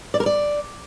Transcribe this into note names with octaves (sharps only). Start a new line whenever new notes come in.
D5
A#4
D5